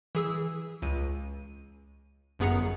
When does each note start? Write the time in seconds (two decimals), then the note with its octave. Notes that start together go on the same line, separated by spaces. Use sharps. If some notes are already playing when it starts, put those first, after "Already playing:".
0.15 E3 G#4 E6
0.82 C#2 D#7
2.39 G1 F#2 B3 G#4 A#5 C#7